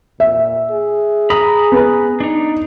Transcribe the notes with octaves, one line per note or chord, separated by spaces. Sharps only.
A#2 E5
G#4
A#5 B5 D#6
B3 B4
D4 D#4